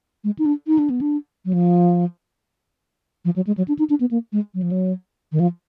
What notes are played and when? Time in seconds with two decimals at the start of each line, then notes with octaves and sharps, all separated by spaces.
0.24 G#3
0.39 D#4
0.46 D4
0.67 D#4
0.79 D4
0.90 B3
1.01 D4
1.45 F#3
1.53 F3
3.25 F3
3.36 F#3
3.47 G#3
3.57 F#3
3.68 D4
3.79 D#4
3.90 D4
4.00 B3
4.11 A#3
4.32 G#3
4.54 F#3
4.62 F3
4.71 F#3
5.32 D#3
5.40 F3